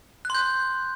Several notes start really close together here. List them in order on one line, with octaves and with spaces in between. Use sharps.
F#6 C6 G6